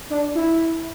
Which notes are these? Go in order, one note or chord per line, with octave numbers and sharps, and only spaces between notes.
D4
E4